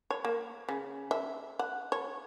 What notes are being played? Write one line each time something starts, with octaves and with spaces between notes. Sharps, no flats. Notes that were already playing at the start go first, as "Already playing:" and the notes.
C#5
A#3
C#3
E5
F#5
C#5